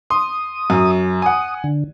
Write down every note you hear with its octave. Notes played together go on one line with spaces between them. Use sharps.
C6 D#6
F#2
F#5 G#5 D#6
D3